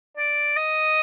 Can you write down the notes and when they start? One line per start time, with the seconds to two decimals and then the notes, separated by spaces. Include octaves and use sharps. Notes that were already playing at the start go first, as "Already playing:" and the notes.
0.17 D5
0.57 D#5